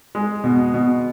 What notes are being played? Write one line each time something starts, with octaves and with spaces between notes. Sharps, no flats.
G#3
B2
B2